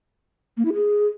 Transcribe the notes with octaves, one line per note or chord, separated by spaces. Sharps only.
A#3
E4
G#4